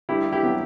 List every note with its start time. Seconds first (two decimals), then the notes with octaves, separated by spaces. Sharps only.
0.09 G2 E4 G4
0.32 E4 G4
0.43 F#3 B3